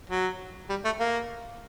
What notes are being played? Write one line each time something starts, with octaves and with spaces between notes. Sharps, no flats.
F#3
G3
A3
A#3